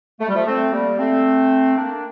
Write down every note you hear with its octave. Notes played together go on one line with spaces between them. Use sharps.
A3
G3
F3 A3
A3 C4
G3 A#3
A3 C4
A#3 D4